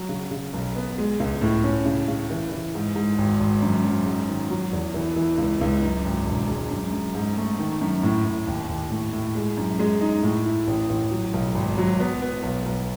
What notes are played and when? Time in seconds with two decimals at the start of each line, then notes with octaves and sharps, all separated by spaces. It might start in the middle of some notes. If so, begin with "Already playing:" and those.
Already playing: F#3
0.09 C#3
0.31 C#3
0.53 B1
0.76 B3
0.98 G#3
1.20 C#2
1.42 A2
1.64 C#4
1.86 C#3
2.08 C#3
2.30 E3
2.52 E3
2.75 G#2
2.95 G#2
3.18 G#1
3.40 G#1
3.62 F#2
3.84 F#2
4.06 G#2
4.28 D#3
4.50 F#3
4.72 E2
4.94 E3
5.16 E3
5.38 C#2
5.61 C#2
5.83 F#2
6.05 G#1
6.26 E1
6.48 G#3
6.71 F#2
6.92 F#2
7.14 G#2
7.37 A3
7.59 D#3
7.81 F#2
8.03 A2
8.24 A2
8.47 D#2
8.69 D#2
8.90 A2
9.13 A2
9.35 G#3
9.57 F#2
9.79 G#3
10.01 D#4
10.23 A2
10.46 E4
10.67 A1
10.90 A1
11.11 F#3
11.33 B1
11.55 G#1
11.78 F#3
12.00 B3
12.22 B3
12.43 B1
12.66 B1